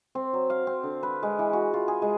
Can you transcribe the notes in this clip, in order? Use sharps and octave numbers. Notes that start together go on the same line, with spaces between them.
C4
F#3
F5
C4
D3
B4
G#3
E3
F#4
F4
G#4
G#3